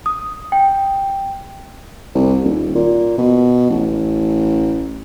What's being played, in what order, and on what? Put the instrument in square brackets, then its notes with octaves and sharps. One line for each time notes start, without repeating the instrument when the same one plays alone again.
[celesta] D#6
G5
[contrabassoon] C2
D#1
A#2
B2
A1